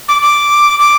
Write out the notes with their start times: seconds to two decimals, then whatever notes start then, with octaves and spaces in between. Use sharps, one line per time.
0.08 D6
0.22 D6
0.80 D6